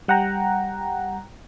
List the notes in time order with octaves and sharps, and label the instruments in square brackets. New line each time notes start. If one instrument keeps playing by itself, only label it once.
[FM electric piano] G3 F#5 G5 A#5